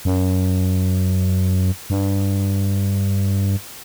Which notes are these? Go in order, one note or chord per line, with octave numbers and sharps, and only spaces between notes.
F#2
G2